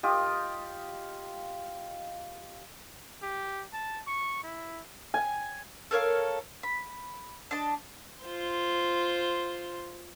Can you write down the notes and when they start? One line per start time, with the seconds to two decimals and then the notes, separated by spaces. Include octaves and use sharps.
0.03 F4 G4 D#5
3.22 G4
3.73 A5
4.07 C#6
4.43 E4
5.14 G#5
5.91 A4 A#4 C#5 F5
6.63 B5
7.51 D4 D#5 A5
8.24 F4 C5